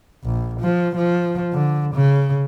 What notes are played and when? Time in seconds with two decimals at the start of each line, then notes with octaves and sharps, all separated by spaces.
0.24 A#1
0.61 F3
0.96 F3
1.53 D3
1.95 C#3